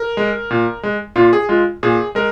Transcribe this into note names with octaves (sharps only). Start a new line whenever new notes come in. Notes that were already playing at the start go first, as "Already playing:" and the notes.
Already playing: A#4
G#3
A#2
G#3
A#2 F4
G#4
G#3 F4
A#2 G#4
G#3 A#4